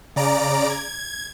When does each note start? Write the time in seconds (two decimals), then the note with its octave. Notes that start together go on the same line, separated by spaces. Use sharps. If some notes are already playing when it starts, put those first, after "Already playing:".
0.16 C#3 D5 A#5 D7
0.70 G#6